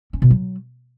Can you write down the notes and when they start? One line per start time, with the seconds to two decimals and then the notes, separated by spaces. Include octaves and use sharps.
0.13 C#4
0.22 B2
0.30 F#3